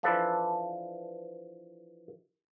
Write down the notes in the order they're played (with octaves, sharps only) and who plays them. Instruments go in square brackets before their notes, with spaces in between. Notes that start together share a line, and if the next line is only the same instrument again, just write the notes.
[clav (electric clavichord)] E3 F3 D4 A4 B4